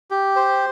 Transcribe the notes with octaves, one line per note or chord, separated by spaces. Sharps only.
G4
C5